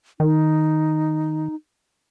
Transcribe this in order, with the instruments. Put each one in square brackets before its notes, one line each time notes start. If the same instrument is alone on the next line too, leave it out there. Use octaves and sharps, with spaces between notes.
[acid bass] D#3 [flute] D#4